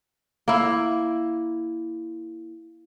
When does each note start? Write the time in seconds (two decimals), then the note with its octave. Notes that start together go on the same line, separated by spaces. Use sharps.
0.48 A#3 E4